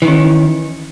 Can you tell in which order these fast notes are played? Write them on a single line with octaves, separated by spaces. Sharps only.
E3 D#3 C#4